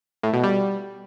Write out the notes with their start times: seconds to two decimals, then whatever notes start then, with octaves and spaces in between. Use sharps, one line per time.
0.23 A2
0.33 B2
0.43 G3